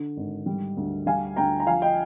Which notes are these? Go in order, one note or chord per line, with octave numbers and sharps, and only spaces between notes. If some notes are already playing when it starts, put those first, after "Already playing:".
Already playing: D3
G#1
G3
D2
G3 F5 G#5
D2 G5 A#5
A#5
F3 F5 G#5
D#5 G5